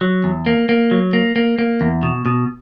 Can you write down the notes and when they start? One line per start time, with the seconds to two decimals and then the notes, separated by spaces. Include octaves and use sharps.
0.01 F#3
0.24 E2
0.46 A#3
0.69 A#3
0.91 F#3
1.13 A#3
1.36 A#3
1.59 A#3
1.81 E2
2.03 B2
2.26 B2